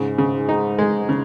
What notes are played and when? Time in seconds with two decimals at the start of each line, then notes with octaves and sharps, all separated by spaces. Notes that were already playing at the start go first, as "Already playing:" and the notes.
Already playing: G#2 C#3
0.18 C#3
0.49 D#4
0.79 G#3
1.09 C#3